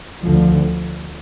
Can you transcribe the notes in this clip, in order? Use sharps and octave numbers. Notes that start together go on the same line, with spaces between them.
D2 D3 F3